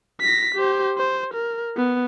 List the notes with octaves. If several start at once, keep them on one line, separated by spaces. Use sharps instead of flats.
A#6 B6
G4 C5
C5
A#4
B3